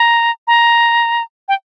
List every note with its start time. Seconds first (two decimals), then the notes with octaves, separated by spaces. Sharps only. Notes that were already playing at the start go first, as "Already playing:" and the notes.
Already playing: A#5
0.47 A#5
1.48 G5